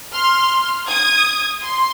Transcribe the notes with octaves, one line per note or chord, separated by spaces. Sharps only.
C6 F6
D#6 G#6
C6